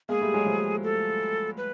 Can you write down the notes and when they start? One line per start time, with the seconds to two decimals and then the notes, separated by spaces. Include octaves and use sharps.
0.09 G#3 A#3 G#4
0.21 G3 A3
0.34 F#3 G#3
0.46 F3 G3
0.84 A4
1.57 B4